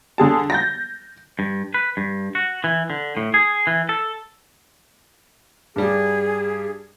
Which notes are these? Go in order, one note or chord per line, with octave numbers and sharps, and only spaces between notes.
D3 G#4 A5
G6 A6 A#6
G2
B4
G2
F#4
E3
D3
A2
G#4
E3
A4
G2 G3 G#4